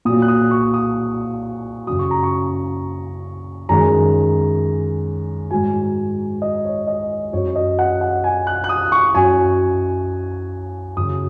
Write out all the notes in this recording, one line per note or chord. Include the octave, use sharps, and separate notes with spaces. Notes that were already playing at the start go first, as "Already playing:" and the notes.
A#2 F#3 D#6
F#6
D#6
C#6
D#6
F#2 C#3 F#3 D#6
C#6
A#5
C#6
F#2 D#3 G#3 A#5
G#2 F#3 G#5
D#5
C#5
D#5
F#2 F#3 C#5
D#5
F#5
F#5
G#5
F#6
F#6
D#6
C#6
F#2 F#3 G#5
F#2 C#3 F#3 D#6